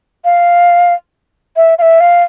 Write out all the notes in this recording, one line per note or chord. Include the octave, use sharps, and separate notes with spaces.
F5
E5
F5
E5
F5